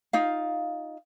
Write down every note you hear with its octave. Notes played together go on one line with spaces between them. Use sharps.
D#4 F4 F5